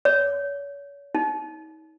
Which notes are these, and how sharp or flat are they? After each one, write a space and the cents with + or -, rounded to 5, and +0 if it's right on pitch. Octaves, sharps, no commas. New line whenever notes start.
C#5 +35
D#4 +35